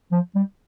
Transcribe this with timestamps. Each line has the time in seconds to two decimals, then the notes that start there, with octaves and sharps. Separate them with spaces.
0.12 F3
0.35 G3